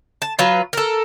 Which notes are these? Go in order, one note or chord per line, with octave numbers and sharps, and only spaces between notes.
A5
F#3 F4 B4
A4 A#4